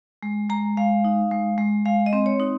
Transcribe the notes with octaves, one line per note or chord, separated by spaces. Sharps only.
G#3
G#3 A#5
G#3 F5
D#4
G#3
G#3
G#3 F5
D#5
C4
C#5
D#4